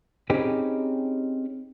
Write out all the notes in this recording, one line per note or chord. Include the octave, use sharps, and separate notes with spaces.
C4 C#4 D#4 G4 G#4 B4